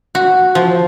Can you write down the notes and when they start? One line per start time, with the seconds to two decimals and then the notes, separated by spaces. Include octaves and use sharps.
0.15 F#4
0.55 F3